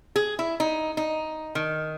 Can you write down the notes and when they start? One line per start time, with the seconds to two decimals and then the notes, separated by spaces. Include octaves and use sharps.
0.16 G#4
0.39 E4
0.60 D#4
0.97 D#4
1.55 D#3